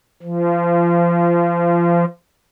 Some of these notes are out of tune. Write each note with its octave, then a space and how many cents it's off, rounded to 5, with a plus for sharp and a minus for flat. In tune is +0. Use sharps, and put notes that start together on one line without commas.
F3 -30